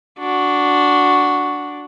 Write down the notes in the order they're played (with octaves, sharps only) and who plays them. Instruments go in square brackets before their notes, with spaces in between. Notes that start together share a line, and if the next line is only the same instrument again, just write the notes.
[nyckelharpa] D4 F#4